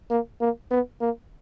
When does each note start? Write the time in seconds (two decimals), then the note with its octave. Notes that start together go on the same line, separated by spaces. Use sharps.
0.10 A#3
0.41 A#3
0.71 B3
1.01 A#3